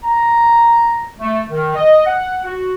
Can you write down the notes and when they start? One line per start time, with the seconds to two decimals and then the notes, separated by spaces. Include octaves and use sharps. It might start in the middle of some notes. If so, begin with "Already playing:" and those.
0.04 A#5
1.20 A3
1.49 D#3
1.75 D#5
2.06 F#5
2.44 F#4